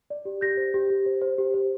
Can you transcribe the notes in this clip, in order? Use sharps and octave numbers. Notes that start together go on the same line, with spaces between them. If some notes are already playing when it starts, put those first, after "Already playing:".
D5
G4
G4 G6 A#6
C5
G4
G4
C5
C5
G4
C5